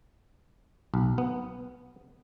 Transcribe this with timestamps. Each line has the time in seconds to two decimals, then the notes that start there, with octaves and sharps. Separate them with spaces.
0.94 B1
1.18 B3